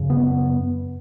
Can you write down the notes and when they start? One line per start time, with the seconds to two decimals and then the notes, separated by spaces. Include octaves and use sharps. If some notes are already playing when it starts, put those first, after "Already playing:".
Already playing: F#2 C#3
0.10 B3